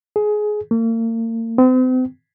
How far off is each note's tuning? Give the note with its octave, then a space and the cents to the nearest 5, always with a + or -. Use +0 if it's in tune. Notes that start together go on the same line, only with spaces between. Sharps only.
G#4 +20
A#3 -40
C4 -40